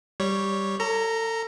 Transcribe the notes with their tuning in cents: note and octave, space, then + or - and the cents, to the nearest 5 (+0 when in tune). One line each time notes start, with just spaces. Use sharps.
G3 +0 C#5 +0
A4 +35 A#5 +0